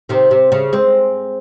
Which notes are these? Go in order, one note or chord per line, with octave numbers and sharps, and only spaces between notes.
C3 D#3
C3
C#3
G#3 C4